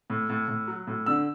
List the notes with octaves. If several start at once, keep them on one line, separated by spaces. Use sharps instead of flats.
A2
A2
A2
F#3
A2
D3 E6